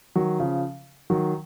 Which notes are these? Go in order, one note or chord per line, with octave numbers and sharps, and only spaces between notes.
D#3 F#3
C#3 F3
D#3 F#3